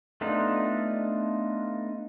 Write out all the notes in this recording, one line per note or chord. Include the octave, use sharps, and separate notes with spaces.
A3 B3 D4 D#4 F4